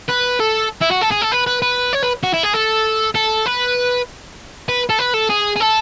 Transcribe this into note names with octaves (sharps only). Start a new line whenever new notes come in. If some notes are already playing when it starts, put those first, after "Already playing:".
B4
A4
E4
F#4
A4
G#4
A4
B4
B4
B4
C#5
B4
F#4
E4
G#4
A4
A4
B4
B4
A4
B4
A4
G#4
G#4
A4